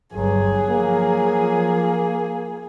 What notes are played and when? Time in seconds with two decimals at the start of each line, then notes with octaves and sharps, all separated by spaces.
0.14 G1 D2 G2 F#3 G#4
0.69 F3 A#3